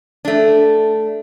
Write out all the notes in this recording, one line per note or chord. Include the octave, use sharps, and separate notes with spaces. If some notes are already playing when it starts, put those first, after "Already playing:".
A3 D4